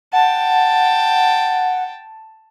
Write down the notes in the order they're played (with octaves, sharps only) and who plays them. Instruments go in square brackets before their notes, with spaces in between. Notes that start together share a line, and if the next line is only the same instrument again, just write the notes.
[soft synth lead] F#5 [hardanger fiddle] G5 A5